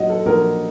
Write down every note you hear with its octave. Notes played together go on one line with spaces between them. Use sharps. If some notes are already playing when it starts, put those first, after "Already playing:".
Already playing: A#1 F#3 D#5 F#5
A4
A#1 A#4